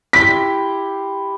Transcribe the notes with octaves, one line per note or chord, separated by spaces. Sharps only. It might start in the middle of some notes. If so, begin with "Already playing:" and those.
E4 G4 C6 B6